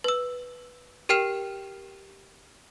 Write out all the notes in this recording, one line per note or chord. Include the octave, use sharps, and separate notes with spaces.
B4 E6
G4 A#4 G5 F6 C7 E7